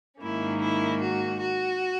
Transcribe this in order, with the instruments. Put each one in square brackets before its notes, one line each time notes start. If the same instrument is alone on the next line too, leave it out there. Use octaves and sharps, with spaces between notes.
[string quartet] G#2 D#3 A#3 C#4 E4
E4
F#4
F#4